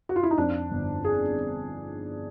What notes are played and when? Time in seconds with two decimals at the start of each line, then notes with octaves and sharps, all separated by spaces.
0.09 F#4
0.16 F4
0.23 E4
0.31 D#4
0.38 F2 D4
0.71 G1
1.05 G#4